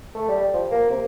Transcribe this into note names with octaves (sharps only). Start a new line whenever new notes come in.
A3
G3
F3
A#3
C3